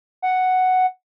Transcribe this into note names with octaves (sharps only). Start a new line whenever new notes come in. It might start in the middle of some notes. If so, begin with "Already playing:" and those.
F#5